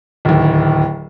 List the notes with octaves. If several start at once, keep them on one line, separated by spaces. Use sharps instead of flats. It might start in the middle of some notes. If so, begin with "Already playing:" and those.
D1 D#2